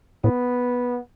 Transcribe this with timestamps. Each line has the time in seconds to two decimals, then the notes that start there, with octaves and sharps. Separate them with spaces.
0.24 A2 B3